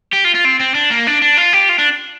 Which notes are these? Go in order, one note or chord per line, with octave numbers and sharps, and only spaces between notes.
G4
F4
F4
C4
C4
D4
A#3
D4
D4
F4
G4
F4
D4